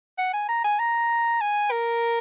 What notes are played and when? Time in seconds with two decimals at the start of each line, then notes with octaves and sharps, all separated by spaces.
0.19 F#5
0.33 G#5
0.49 A#5
0.64 G#5
0.79 A#5
1.41 G#5
1.71 A#4